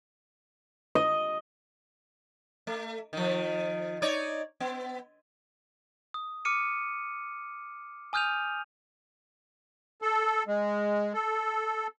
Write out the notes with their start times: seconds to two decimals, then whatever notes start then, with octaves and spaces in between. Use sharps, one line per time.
0.95 D#5
2.67 A3
3.13 D#3 F3
4.02 D#4 C#5 D5
4.60 B3
6.14 D#6
6.45 D6 F6 C#7 D#7
8.13 G#5 D#6 F6 G6 D#7 F7
10.02 A4
10.48 G#3
11.13 A4